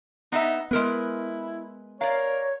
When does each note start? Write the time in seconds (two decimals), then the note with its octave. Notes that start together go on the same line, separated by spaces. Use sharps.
0.32 B3 D#4 E5
0.71 G#3 B3 E4 A#4 B4
2.01 A#4 C#5 D5 F5